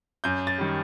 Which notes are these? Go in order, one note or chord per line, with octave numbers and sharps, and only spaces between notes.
F#2 G6
A6
D#3 G3